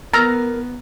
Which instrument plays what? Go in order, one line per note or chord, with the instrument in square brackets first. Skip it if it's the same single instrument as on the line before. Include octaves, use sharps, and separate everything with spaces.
[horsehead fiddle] B3 [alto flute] A#4 [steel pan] A#5 [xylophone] E6 F6 A6